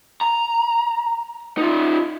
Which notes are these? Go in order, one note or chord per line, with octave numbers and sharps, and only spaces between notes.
A#5
D#4 F4